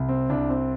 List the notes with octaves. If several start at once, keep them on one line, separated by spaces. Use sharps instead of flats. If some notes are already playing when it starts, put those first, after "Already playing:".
Already playing: C2
C4
C2 D4
C4